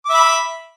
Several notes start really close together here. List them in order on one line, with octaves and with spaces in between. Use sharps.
D6 E5 B5